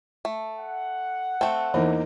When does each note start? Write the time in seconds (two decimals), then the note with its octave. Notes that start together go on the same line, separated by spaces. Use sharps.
0.25 A3
0.58 F#5
1.41 A3 C4 A5
1.74 E2 E3 A#3 D#4